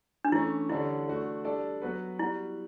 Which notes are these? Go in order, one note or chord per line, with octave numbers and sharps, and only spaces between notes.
D4
E3 A3 C#4 E4
D3 G3 D4 E4 A4 C#5
A3 D4 F#4
G3 D4 A4 D5
F#3 B3 F#4 B4
G3 B3 E4 F#4